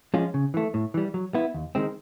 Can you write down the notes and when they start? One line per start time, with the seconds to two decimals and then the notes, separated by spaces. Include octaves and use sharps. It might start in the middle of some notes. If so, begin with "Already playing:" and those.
0.14 F3 G#3 C#4 F4
0.34 C#3
0.54 E3 A3
0.74 A2
0.94 E3 G3
1.14 F#3
1.34 B3 E4
1.54 D#2
1.75 D#3 G#3 C4